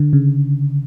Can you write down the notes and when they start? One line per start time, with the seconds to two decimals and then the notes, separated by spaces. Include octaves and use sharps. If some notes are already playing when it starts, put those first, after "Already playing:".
Already playing: D3
0.13 C#3